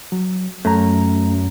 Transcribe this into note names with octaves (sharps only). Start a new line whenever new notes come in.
F#3
F#2 A3 A#5